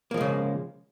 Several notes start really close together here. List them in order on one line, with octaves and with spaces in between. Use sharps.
A#3 F3 G#3 C#3